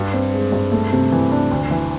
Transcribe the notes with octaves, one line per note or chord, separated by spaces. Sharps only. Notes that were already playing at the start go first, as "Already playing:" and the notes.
Already playing: G2
C4
G#3
G2
A3
C3
E3
D4
D2
E3